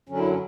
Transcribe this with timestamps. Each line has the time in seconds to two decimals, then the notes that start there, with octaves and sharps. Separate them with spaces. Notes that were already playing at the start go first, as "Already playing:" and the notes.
0.09 F#2 D3 F#3 C#4
0.18 E4
0.29 C#4